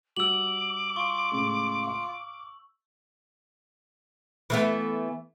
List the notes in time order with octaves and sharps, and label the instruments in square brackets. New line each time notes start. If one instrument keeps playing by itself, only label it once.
[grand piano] G3 F#4 [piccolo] D6 [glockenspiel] E6 F#7
[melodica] F4 [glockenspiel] C#6
[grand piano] A2 C#3 G#3
F5
[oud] E3 A3 B3